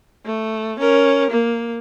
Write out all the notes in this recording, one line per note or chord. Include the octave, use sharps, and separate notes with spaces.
A3
C#4 A#4
A#3